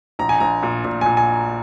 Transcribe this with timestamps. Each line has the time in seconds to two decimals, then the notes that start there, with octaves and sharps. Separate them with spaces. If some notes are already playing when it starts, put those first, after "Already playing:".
0.19 A#1 A#5
0.29 G#5
0.40 A#1 A#5
0.63 A#2
0.85 A#2
1.01 A#2 G#5
1.17 G#5